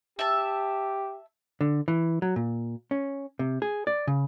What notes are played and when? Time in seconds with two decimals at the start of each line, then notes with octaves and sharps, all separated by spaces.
0.19 G4 E5 A5
1.61 D3
1.88 E3
2.22 F#3
2.36 A#2
2.91 C#4
3.39 C3
3.62 G#4
3.87 D5
4.07 C#3